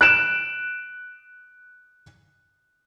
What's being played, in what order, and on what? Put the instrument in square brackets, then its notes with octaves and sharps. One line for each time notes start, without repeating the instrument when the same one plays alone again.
[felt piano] F#6 D7 E7